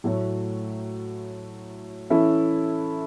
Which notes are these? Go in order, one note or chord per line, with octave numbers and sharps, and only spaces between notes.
A2 F#3 A3 F#4 C#5
E3 C#4 E4 A4 E5